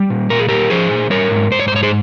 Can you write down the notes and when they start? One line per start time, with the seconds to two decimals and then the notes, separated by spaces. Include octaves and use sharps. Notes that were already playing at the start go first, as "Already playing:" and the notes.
Already playing: G3
0.10 A#2
0.30 A#2 A#4
0.39 G#4
0.49 A#2 G4 A#4
0.70 F3 G#4 C5
0.91 A#2
1.10 G3 A#4 C#5
1.31 G#2
1.51 G#2 C5
1.59 C#5
1.68 C5
1.72 G#2 C#5
1.83 G#4 C5